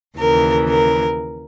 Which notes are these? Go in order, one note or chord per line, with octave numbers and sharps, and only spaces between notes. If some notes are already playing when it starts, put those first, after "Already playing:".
D#2 C#3 E3 A#4
A#4